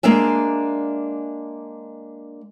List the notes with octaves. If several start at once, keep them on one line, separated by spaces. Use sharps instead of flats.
G#3 A#3 D4 E5 G#5